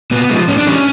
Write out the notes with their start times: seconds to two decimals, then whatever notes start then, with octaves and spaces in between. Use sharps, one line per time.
0.11 A#2 B3
0.29 F3 G#3
0.48 A2 C#4
0.58 D4
0.66 E3 G3 C#4